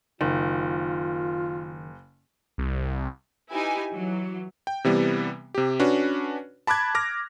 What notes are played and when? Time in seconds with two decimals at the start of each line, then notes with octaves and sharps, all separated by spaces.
0.21 F#1 D#3 F4
2.58 C2
3.52 D#4 E4 G4 B4 G#5
3.92 E3 F#3
4.67 G5
4.84 C3 E3 G3 B3
5.54 C3 G4
5.79 C#4 D4 F#4 B4
6.67 A5 B5 D6 F#6 G#6
6.95 D6 F6 A#6